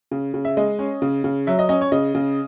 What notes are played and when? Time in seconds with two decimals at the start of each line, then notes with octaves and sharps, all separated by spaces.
0.11 C#3
0.34 C#3
0.45 E5
0.57 G#3 D#5
0.79 C#4
1.02 C#3
1.24 C#3
1.47 F#3 E5
1.59 D#5
1.69 C#4 D#5
1.81 C#5
1.92 C#3 D#5
2.15 C#3